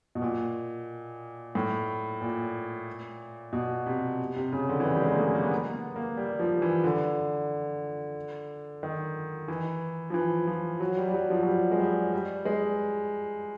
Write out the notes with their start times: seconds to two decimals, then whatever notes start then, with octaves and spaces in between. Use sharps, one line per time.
0.15 B2
0.22 A#2
1.55 A2
2.21 A#2
3.53 B2
3.86 C3
4.36 C3
4.53 C#3
4.69 D3
4.80 E3
4.85 D#3
4.93 G3
5.02 G#3
5.12 A#3
5.19 A3
5.35 A#3
5.44 B3
5.52 A#3
5.74 B3
5.96 A#3
6.17 G3
6.39 F3
6.62 E3
6.84 D3
8.83 D#3
9.48 E3
10.10 F3
10.14 E3
10.47 F3
10.80 F#3
10.97 G3
11.08 G3
11.14 F#3
11.30 F3
11.42 F#3
11.46 G3
11.71 G#3
11.80 G3
12.13 G3
12.45 G#3